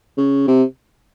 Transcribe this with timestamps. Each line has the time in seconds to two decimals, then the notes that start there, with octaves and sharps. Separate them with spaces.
0.17 C#3
0.48 C3